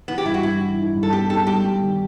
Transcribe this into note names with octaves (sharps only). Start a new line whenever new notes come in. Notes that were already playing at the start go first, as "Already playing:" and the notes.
E3 B3
G4
G2 E4
F#4
G2 E4
E3
D#4
G2
A4
B3 G4
D#4 A4
G3 G4
G3
D#3